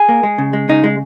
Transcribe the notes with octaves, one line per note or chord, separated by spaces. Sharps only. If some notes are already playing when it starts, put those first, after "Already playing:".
Already playing: G#4
A#3
G#3
C#3
G#3
C#3 D#4
G#3